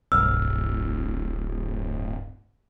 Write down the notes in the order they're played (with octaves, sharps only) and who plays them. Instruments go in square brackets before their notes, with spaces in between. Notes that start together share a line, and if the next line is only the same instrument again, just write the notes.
[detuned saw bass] D1 [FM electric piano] B1 G2 [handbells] E6 F6